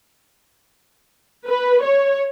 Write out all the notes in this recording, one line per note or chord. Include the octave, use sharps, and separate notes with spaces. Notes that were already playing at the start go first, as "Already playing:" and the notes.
B4
C#5